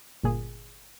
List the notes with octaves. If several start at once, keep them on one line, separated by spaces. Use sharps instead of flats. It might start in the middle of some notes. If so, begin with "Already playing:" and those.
G1 A#2 G#4